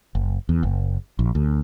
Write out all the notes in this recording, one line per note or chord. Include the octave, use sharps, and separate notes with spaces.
F#1
E2
F#1
A#1
D2